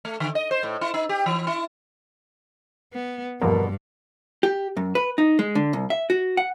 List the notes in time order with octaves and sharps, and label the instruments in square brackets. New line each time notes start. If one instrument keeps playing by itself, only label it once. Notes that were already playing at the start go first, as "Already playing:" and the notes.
[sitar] A3
D3
D#5
C5
A2
E4
D#4
G4
E3
E4
[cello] B3
[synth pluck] E2 F3 A#3 [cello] G2 [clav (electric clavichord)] B2 D3 [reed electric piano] A#4
[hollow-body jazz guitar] G4
F#2
B4
D#4
G#3
D3
C2
E5
F#4
F#5